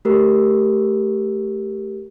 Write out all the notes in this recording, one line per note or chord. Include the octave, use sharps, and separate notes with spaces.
A3 G4 A#4